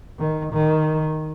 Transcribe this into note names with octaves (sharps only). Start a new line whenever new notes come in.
D#3
D#3